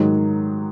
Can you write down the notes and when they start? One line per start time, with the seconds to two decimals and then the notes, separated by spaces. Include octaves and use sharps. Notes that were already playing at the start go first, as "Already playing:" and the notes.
Already playing: G#2 D#3 F#3